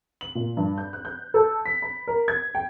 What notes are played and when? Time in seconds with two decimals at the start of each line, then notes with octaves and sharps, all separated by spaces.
0.21 F#7
0.35 A#2
0.57 G2
0.78 G6
0.93 F#6
1.05 G6
1.34 A4
1.66 B6
1.82 B5
2.07 A#4
2.28 G#6
2.55 G5